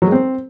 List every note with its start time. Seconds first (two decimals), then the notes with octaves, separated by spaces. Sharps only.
0.02 F#3
0.07 G#3
0.12 C4